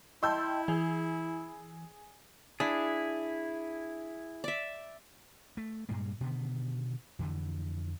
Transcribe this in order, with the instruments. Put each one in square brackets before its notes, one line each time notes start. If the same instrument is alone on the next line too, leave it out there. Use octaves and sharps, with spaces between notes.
[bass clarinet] E4 [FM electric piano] D#5 G5 A5 [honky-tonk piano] C6 E6 G6
[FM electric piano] E3 [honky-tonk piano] G#4
[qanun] D4 [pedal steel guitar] E4 G#4
[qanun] D5 E5
[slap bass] A3
G2 A#2 G3 G#3
B2 D3 D#3 B3
F2 D3 E3